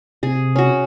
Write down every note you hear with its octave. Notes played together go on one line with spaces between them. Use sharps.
C3 G#4
C#4 F#4